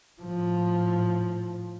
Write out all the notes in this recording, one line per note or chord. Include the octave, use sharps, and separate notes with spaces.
A2 F3